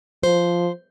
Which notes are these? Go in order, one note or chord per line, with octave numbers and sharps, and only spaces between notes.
F3 C5